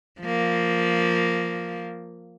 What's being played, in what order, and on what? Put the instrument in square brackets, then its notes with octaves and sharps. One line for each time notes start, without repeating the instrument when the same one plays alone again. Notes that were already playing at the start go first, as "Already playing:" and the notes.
[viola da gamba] F3 A#3